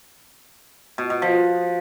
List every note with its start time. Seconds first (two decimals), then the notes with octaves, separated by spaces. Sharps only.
0.98 B2
1.10 B2
1.22 F3